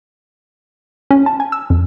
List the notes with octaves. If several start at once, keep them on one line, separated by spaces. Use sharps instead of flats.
C#4
A5
G#5
E6
F2